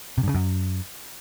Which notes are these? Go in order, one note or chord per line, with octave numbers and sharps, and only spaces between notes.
C3
G2
C#3
F#2